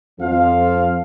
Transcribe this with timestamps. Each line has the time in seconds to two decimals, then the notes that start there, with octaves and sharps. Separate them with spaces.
0.19 F2 F3 F5